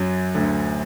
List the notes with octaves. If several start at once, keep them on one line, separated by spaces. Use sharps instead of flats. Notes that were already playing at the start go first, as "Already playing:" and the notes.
Already playing: F#2 F#3
D2 D3